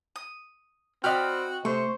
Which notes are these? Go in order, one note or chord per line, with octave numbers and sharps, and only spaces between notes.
D#6
C4 F#4 D5 D#5 G5 B5 F6
C3 A3 C5 C#6